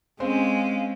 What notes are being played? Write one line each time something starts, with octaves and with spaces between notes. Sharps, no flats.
G#3 C4 C#4 F5